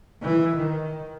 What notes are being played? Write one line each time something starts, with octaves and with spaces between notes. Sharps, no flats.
E3
D#3